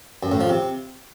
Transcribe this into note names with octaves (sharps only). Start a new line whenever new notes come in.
F#2
A2
F3
C3